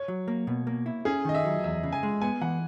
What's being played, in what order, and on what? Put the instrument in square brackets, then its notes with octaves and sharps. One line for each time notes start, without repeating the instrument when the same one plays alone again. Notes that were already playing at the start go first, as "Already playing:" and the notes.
Already playing: [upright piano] C#5
[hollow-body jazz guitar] F#3
A#3
B2
A#3
E4
[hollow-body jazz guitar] C#4 [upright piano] G#4
[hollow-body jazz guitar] D#3 [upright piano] D#5
[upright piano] E5
[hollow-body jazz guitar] F#3
[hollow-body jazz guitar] E2 [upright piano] E5
[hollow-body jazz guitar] C#3
[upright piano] G#5
[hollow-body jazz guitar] G#3
[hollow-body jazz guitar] B3 [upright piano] G#5
[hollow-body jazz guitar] E3 [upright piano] F#5